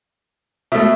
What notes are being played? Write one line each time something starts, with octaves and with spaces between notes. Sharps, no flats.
B2 A3 E5